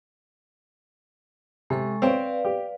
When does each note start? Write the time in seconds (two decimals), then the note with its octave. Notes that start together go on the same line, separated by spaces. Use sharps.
1.70 C3 G#3 A4 C#6
2.02 C4 B4 C#5 D5 F5
2.45 G4